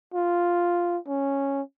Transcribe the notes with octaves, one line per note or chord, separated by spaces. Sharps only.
F4
C#4